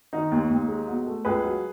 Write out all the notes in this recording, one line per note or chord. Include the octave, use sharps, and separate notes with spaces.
D#3 D#4
D#2
D#2
G#3
B2
A3
C#2 G#4 B4
F#3